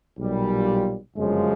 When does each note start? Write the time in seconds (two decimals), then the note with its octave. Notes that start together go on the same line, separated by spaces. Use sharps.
0.19 B1 A#2 G3
1.15 G1 F#2 C#3 F3 G#3